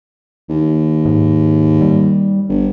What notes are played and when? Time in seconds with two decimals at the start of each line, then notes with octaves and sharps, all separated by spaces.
0.49 D#2
1.05 G#2
1.81 G3
2.49 G1